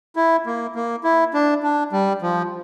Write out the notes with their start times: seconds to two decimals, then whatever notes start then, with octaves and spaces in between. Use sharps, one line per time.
0.16 E4
0.46 A#3
0.75 A#3
1.04 E4
1.34 D4
1.63 D4
1.93 G3
2.22 F3